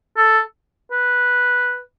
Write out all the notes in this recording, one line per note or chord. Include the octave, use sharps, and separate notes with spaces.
A4
B4